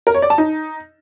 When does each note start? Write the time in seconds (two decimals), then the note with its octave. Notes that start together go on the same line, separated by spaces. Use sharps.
0.07 A#4
0.15 C#5
0.22 D5
0.30 A5
0.38 D#4